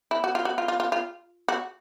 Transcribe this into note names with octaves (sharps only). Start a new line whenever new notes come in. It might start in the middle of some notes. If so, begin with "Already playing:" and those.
E4
F#4
F4
F#4
F4
F4
F4
F4
F#4